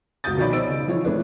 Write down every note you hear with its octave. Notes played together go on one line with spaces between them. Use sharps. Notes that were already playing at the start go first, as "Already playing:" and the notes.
G1 C#2 F#4 D#6 G6 A6
B2 D#3 F3 C#5 D5 B5
D#4 C5 E6 D7
C#3
E3 F3 F4 C#5
E3 A3 B3 D4